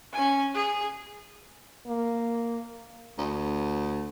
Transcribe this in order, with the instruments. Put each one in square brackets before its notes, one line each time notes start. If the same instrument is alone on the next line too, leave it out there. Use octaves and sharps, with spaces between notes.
[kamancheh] C#4 G#5
G#4
[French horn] A#3
[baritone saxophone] D2